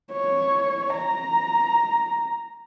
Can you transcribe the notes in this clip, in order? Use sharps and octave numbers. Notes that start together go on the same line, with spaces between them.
C#5
A#5